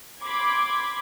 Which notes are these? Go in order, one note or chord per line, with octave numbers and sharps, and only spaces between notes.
B5 C6 D6 G#6